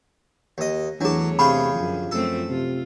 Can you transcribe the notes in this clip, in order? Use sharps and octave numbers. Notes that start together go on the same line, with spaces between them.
D#2 D#5
E2 E3 F#3 A3 D4 G#4 C#5 A5
C3 G#4 F5 G5 B5 C#6
F#2 D3 F3
F#2 A3 C4 A4
C3 F4